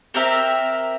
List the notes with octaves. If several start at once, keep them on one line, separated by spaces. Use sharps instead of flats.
C4 G4 A#4 E5